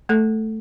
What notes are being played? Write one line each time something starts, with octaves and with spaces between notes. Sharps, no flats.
A3 A4